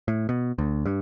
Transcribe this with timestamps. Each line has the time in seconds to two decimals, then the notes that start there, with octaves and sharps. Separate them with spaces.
0.08 A2
0.29 B2
0.58 D2
0.85 G2